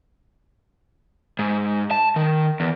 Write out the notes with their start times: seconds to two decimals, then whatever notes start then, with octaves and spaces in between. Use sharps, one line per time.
1.39 G#2
1.91 A5
2.16 D#3
2.60 E2